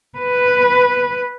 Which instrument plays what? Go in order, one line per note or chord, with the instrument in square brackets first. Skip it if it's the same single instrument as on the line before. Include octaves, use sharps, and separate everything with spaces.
[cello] B4